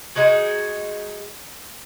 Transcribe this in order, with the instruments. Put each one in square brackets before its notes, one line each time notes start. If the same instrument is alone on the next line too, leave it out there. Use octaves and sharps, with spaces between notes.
[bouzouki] G#3 D#4 F#4 G#4